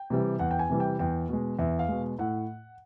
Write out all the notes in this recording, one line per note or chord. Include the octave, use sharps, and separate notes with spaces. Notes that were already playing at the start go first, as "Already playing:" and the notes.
Already playing: G5
C3 E3 G3
E2 F#5
G5
G#5
C3 E3 G3
G5
E2 G5
B2 G#3
E2 E5
F5
B2 G#3
A2 F#5